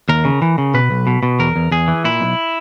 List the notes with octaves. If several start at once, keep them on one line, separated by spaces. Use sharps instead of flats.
D#2 A#4
C#3
E3
C#3
B2 B4
B1
B2
B2
E2 A#4
E2
E2 G#4
E3
A#2 E4
B1